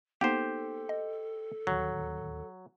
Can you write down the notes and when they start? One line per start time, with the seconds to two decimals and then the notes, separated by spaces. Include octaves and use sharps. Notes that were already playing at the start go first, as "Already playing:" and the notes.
0.21 A#3 B3 D#4 G4 A4 C5
0.89 D#5
1.67 D1 D#2 F#3